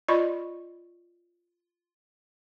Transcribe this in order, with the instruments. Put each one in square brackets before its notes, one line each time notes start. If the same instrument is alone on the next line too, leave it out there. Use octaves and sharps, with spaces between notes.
[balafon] F4 D5 D#5 B5 C#6